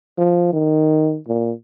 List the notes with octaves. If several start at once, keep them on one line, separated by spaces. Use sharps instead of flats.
F3
D#3
A#2